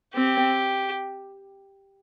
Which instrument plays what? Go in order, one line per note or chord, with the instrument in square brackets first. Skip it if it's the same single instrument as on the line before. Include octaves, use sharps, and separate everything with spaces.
[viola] C4 [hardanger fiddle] G4